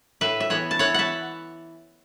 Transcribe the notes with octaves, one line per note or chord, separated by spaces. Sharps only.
A2 B4 E5
E5
E3 B3 C#5 F#5
A5
E3 C#5 F#5
E5 F#5 A5